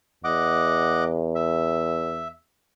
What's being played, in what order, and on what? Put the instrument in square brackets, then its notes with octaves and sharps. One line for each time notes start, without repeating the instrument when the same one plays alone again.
[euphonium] E2 [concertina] D#5 F#5 D6
[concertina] E5